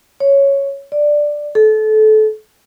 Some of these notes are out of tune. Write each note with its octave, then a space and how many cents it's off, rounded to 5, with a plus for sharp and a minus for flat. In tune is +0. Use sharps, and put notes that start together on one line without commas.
C#5 +0
D5 +5
A4 -25